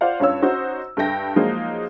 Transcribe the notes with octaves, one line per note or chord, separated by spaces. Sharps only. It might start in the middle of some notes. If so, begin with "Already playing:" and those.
F4 C5 D5 F5 F#5
G2 C#4 F4 C#5 E6
C#4 D#4 F#4 C5
G2 A4 E5 G5 A#6
F3 F#3 G#3 A#3 D#4 F4